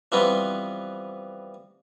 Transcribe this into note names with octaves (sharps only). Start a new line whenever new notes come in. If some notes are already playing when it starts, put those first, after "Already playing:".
E3 F3 G3 B3 C4